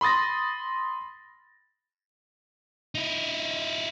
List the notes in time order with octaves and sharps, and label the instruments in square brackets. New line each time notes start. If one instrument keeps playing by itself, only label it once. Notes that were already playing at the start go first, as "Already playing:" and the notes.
[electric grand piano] B5 C6 D#6 A6 A#6
[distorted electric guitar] D#4 E4